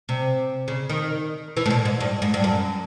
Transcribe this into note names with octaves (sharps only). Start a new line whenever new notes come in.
C3
C#3
D#3
E3
A2
A#2
G#2
G2
G#2
G2
F#2